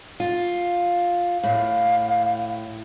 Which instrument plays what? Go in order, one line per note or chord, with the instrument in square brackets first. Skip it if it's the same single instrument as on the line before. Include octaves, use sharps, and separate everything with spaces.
[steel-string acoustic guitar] F4
[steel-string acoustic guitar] A2 [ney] F5